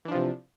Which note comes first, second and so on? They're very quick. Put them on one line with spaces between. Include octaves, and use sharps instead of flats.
E3 D4 F3 C3